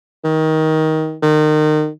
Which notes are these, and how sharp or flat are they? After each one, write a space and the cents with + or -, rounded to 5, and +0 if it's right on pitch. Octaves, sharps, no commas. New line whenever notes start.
D#3 +20
D#3 -25